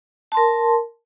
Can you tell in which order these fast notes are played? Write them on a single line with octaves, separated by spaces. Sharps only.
A5 C6 A#4